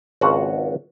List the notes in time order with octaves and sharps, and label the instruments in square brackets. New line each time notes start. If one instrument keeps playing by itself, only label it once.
[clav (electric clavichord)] G#1 C#2 F4 F#4 F#5